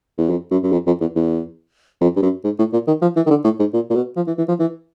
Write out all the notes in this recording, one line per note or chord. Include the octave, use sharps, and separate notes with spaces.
E2
F2
F#2
F#2
F2
F2
E2
E2
F2
G2
F#2
G#2
A2
A#2
D#3
F3
E3
D#3
D3
A2
G#2
A#2
A#2
B2
F3
E3
E3
F3
E3